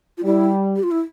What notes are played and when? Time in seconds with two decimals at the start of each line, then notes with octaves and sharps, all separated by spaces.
0.18 F4
0.24 G3 E4
0.76 G4
0.83 F4
0.91 E4